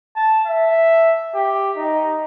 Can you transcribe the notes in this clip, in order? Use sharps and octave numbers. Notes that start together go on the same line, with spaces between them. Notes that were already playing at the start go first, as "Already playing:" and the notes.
A5
E5
G4
D#4